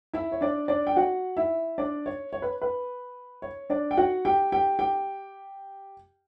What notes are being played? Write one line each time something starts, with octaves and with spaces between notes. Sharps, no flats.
E4 E5
C#5
D4 D5
D4 D5
G5
F#4 F#5
E4 E5
D4 D5
C#5
C#5
B4
B4
C#5
D4 D5
G5
F#4 F#5
G4 G5
G4 G5
G4 G5